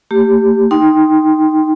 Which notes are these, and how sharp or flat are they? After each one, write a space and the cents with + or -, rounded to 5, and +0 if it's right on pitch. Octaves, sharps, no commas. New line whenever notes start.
A3 +45 G4 +0
D#4 +0 G5 +0 C6 +0